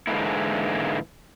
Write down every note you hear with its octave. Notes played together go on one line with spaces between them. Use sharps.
G#2 D3 E3 G#3 A#3 E4